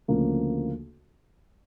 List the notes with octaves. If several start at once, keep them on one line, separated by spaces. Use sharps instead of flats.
D2 C#3 F3 A#3